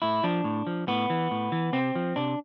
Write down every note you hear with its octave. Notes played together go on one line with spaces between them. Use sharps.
A2 E4
F3 D4
A2
F3
A2 B3
E3
A2
E3
C3 C4
F3
C3 D4